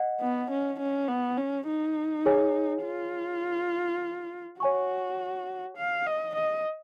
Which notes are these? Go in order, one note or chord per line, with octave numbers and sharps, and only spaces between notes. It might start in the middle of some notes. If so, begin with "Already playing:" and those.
Already playing: D#5 F#5
B3
C#4
C#4
B3
C#4
D#4
G#4 C#5 G#5
F4
F#4 C#5 G#5 C#6
F5
D#5
D#5